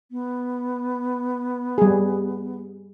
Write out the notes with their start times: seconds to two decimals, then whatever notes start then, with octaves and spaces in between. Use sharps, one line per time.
0.11 B3
1.78 G3 G#4